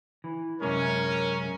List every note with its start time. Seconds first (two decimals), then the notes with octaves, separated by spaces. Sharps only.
0.24 E3
0.62 F#2 C3 G#3 C#4 A#4